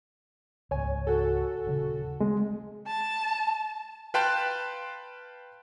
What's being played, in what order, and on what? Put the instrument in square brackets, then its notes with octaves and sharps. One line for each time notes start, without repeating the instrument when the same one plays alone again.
[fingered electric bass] C#2 G#2 [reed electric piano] C#5 G#5
[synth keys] F#4 A4
[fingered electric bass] D#1 C#3
[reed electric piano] G#3 [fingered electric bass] C4
[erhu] A5
[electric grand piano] B4 F5 G5 A5 C6 F#6